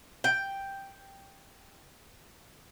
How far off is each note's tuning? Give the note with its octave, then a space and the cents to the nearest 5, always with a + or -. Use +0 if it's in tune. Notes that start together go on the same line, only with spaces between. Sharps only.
G5 +5